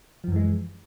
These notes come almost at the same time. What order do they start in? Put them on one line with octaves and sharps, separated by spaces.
F3 F#2 E3 G#3